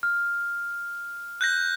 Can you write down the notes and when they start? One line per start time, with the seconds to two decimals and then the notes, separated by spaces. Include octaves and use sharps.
0.03 F6
1.41 F#6 G6 A#6